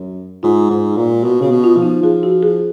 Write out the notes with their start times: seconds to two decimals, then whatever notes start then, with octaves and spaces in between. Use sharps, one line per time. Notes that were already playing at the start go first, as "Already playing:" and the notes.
Already playing: F#2
0.43 G#2 F4
0.70 G#2
0.97 A#2
1.23 B2 F#4
1.41 C#3 F#4
1.50 B2
1.64 F4
1.77 F3
1.83 D#4
2.03 F3 G#4
2.23 F#4
2.43 G#4